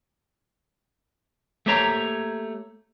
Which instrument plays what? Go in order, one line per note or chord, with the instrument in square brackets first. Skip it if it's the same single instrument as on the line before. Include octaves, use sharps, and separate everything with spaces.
[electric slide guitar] A3 A#3 G4 C5 C#5 A#5